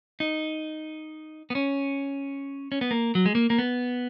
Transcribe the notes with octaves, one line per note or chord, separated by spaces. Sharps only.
D#4
B3
C#4
C#4
B3
A#3
F#3
G#3
A#3
A#3
B3